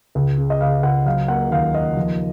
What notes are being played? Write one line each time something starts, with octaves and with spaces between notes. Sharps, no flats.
C#2
C#3
D#5
C#2 F5
C#2 F#5
F#3 F5
A#3 F#5
D#2 F5
A#3 D#5
F3